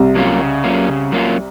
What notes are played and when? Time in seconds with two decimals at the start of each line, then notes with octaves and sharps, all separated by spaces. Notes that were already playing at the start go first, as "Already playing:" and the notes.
Already playing: C2 C3
0.15 F#3 A#3 C#4 F4
0.40 C#3
0.64 F#3 A#3 C#4 F4
0.88 C#3
1.12 F#3 A#3 C#4 F4